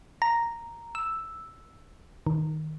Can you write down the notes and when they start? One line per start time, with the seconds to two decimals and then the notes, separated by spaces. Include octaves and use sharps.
0.22 A#5
0.95 E6
2.27 D#3